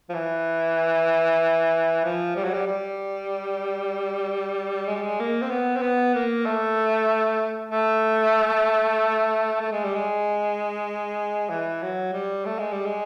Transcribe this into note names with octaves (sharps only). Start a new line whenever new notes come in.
F3
E3
F3
G3
F#3
G3
G3
G#3
G3
G#3
A#3
C4
B3
C4
B3
A#3
A3
A3
A3
G#3
G3
G#3
E3
F#3
G3
A3
G#3
G3
G#3